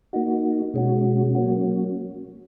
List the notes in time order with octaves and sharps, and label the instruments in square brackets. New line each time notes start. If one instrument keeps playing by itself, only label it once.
[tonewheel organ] A#3 D#4 F#4
B2 G#3 C#4 F#4
F#3 A#3 C#4 F#4